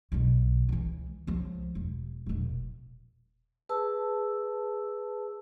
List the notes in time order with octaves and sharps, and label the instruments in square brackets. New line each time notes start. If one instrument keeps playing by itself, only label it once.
[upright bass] B1 B2
C#2 E3
C#2 F3
E1
E1 A#1
[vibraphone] G#4 B4 A5 E6